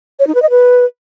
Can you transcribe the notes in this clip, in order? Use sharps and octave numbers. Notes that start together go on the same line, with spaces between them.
C#5
D#4
B4
D#5
B4